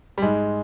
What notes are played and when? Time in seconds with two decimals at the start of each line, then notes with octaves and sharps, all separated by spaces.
0.18 G3
0.22 G#2 G#3